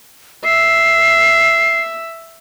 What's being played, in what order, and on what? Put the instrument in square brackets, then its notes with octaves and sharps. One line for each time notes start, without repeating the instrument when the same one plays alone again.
[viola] E5 [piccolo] C7